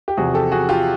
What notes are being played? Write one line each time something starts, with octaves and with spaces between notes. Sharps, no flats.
G4
E2 C3 F3 F#4 G#4
G4 A4
F#4 G#4
F4 G4